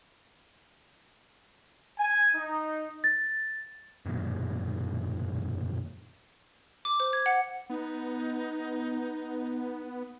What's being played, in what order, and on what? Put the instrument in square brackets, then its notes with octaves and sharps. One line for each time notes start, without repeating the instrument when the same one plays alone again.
[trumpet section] G#5
D#4
[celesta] A6
[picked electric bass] E1 F#2 A#2 D#3
[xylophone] D6
C5
G#6
F#5
[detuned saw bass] B3 [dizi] D#4